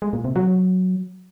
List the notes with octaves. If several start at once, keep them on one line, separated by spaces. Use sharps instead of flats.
G#3
A#2
C3
F#3